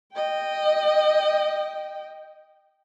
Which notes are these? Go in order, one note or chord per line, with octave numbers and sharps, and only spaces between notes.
D#5 G5